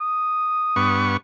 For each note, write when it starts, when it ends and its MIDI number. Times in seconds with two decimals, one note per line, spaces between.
0.01 0.98 87
0.76 1.17 43
0.76 1.17 59
0.76 1.17 85